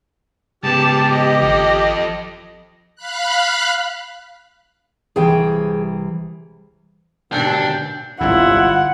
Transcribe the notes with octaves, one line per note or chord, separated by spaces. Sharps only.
G#2 C#3 B3 G4 A5
D#5
G#1 F3 A4
F5 B5 F#6
C2 E3 G#4 G5
D#2 G#2 B2 D3 D4 G5
G1 C2 G#2 E4 F4 F#5